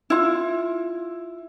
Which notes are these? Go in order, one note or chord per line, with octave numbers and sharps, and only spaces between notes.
E4 F4